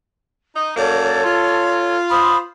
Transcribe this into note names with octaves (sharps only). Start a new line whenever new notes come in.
D#4 D#5
F#2 A#3 A4 C#5 D5
F4
C5 B5 D#6